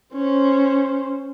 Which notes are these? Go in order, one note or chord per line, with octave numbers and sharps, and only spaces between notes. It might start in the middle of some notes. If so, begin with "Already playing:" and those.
C#4 C5